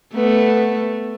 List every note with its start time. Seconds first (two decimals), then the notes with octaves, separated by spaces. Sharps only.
0.15 A3 B3